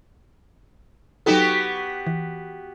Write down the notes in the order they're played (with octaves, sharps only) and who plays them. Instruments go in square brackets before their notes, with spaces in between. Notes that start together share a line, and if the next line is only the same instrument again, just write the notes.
[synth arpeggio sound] F#3 D#4 A4 [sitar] B3 F#4 G4
[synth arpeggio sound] E3